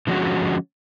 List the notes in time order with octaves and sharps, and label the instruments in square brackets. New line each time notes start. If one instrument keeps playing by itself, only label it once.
[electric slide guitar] D3 F3 G#3 C#4 F#4